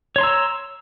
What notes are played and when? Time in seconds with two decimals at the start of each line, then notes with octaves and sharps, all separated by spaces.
0.16 C#5
0.18 C6
0.21 A#5
0.23 E6